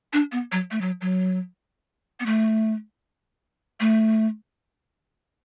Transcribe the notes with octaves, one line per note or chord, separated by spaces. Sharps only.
D4
B3
F#3
A3
F#3
F#3
B3
A3
A3